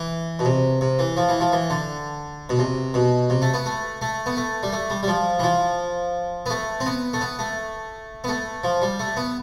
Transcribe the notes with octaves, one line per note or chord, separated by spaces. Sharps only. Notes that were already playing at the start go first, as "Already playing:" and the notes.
Already playing: E3
B2
C3
C3
E3
F3
E3
F3
E3
D3
B2
C3
B2
C3
A3
B3
A3
A3
B3
A3
G3
A3
G3
G3
F3
E3
F3
B3
A3
C4
B3
A3
B3
A3
B3
A3
F3
G3
A3
B3